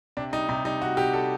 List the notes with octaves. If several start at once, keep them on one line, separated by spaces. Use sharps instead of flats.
C3 D4
G3 D#4
C3 D#4
G3 D#4
G3 F#4
C3 G4
G3 A4